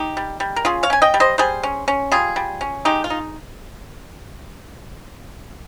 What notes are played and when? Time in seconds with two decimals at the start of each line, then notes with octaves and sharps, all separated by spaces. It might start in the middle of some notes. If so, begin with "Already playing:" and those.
Already playing: D#4 G4
0.17 G3
0.40 G3
0.56 A#4
0.65 C#4 F4 G#4
0.83 C#5 F5
0.90 C#4 G#5
1.02 D#5 G5
1.14 G3
1.20 C5 D#5
1.38 G3 G#4 C5
1.63 C#4
1.88 C#4
2.12 G3 F4 G#4
2.36 G3
2.61 C#4
2.85 G#3 D#4 G4
3.04 F4
3.10 D#4